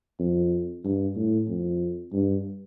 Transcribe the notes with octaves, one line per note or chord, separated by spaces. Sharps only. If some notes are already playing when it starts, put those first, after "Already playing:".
F2
G2
A2
F2
G2